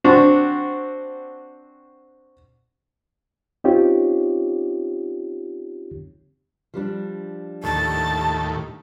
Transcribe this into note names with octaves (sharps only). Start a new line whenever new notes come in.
C4 D4 F#4
C4 C#4 D#4 F4 G4 C#5
F3 G3 D4
D#2 A2 A5